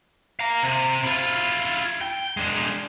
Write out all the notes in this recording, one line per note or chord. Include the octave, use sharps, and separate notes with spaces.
F5 A#5
C3
E4 F4
G5
G#3 D4